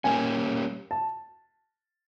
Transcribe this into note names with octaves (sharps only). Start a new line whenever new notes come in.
G3 A#3 C#4 G#5
A5